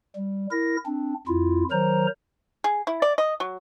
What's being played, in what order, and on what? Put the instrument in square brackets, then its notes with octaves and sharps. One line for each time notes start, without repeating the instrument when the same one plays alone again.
[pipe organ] G3
E4 A#4 A#6
C4 D4
F2 E4 F4
D#3 F#3 A#4 C5 A#5
[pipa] G#4
E4
D5
D#5
F#3